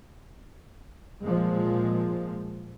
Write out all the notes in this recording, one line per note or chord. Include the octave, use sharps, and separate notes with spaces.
A#2 F3 G#3